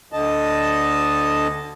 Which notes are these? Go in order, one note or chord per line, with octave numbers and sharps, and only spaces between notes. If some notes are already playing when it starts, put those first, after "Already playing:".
D2 D3 D#5 A5